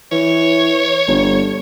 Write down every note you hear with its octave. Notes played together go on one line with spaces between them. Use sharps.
E3 C#5
G1